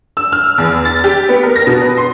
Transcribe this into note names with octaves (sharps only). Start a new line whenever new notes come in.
E6
F6
E2
A6
G4
B3
A#4
A#6
B2
B4
C6